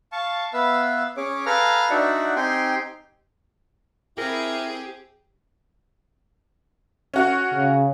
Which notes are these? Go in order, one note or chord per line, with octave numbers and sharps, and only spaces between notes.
F5 A5 C#6
B3 B4 E5 F5 E6
C#4 G#4 C#5 D6
A4 B4 F5 G#5 A#5 F6
D4 D#4 F#4 D5 E5 F#5
C4 D#4 G4 G5 G#5 C6
C4 E4 G4 G#4 A#4
C#4 F#4
C#3